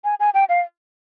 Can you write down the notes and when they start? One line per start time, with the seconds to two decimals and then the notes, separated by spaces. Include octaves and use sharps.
0.04 G#5
0.20 G#5
0.34 G5
0.49 F5